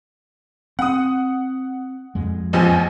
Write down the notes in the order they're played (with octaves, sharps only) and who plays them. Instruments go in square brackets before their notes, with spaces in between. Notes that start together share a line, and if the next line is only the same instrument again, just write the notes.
[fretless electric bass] C4 [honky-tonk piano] F#5 D#6
[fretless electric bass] F2 G#3
[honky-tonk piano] A1 E2 F3